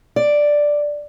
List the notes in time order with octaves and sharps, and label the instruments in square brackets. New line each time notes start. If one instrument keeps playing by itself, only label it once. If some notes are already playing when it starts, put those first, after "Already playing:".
[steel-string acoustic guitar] D5